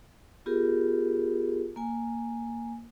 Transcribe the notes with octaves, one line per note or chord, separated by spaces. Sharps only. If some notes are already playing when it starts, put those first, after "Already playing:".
B3 F4 G4 G#4 A#4
A#3 G#5